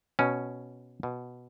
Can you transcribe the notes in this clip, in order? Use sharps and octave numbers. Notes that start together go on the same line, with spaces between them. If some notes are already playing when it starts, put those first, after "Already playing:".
B2 C#4
B2